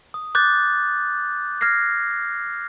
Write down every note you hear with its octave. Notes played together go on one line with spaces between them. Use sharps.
D#6
D6 F#6 G6 A6
F6 G#6 A#6 C7